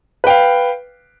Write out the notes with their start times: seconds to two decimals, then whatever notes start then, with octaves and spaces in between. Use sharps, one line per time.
0.24 B4
0.27 G5
0.30 F5